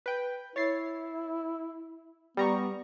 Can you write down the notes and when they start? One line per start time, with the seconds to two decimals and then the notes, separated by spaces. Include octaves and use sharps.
0.06 B4 G5
0.56 E4 C#5 A6 C7
2.37 G3 B3 A#5 C#6